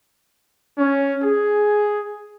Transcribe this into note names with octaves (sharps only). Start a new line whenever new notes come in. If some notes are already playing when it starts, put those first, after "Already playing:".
C#4
G#4